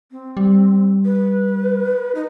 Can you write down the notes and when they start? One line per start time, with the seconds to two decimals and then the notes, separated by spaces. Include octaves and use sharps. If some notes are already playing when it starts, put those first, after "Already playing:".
0.11 C4
0.37 G3
1.05 B4
2.15 D#4